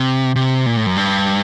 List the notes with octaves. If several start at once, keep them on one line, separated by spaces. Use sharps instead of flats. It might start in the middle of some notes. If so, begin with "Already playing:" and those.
Already playing: C3
C3
A#2
A2
F#2
G2